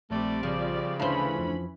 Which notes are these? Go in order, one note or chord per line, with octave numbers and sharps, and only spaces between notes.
A#1 G3 A3 C4 D5
C#3 F3
D2 E3 C#4 E4 C5 F5 A5 B5
F2 F3